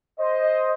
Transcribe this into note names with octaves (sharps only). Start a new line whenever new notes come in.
C5 D#5